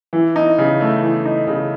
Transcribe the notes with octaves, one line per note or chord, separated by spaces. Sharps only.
E3
D#4
C#3
A3
E3
D#4
C#3